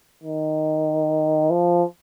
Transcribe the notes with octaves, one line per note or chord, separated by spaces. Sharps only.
D#3
F3